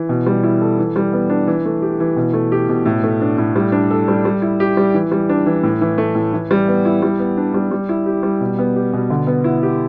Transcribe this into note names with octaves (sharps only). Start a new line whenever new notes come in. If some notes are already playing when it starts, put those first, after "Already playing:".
Already playing: E3
B2
G3
E4
A4
E3
G3
B3
D4
E3
A3
G4
E3
B2
A3
G4
B2
A2
A3
D4
A2
G3
D4
A4
G3
G3
E4
G4
G3
E3
G3
D4
E3
A2
E3
A3
A2
E3
G3
B3
E4
G3
B3
D4
G3
G3
E4
G4
G3
B2
B3
G4
B2
D3
B3
E4
G4